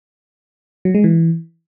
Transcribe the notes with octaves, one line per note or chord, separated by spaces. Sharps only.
F#3
G#3
E3